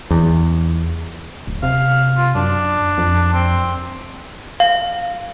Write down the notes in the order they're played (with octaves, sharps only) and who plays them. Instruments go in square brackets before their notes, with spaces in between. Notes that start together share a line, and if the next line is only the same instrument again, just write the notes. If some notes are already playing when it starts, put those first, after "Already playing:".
[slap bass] E2
[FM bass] D1
[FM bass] C3 [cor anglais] F5
[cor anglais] F4
[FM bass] F#2 [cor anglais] D4
[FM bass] F2
[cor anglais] C4
[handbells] F5